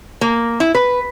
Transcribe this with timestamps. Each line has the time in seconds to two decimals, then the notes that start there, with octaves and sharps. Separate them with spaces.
0.21 A#3
0.60 E4
0.75 B4